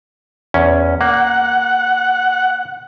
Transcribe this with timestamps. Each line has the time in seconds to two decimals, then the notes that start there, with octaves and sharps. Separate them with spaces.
0.54 E2 C#4
1.01 A#3 F#5